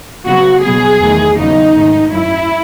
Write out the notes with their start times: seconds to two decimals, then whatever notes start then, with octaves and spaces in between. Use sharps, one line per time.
0.26 C#3 F#3 B3 F#4
0.63 B2 F#3 B3 G#4
1.01 E2 D#3 A3
1.38 E2 C#3 F#3 B3 D#4
1.75 G#2 D#3 A3
2.12 F#2 D#3 F#3 E4